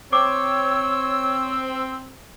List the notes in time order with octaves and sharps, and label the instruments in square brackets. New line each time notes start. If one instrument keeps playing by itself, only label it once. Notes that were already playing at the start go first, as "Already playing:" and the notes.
[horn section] C4 [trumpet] C#5 [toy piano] D6 [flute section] E6